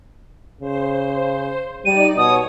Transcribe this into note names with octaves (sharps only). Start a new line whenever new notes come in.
C#3 C5
G3 D#4 D5 D#7
B2 C#5 D#6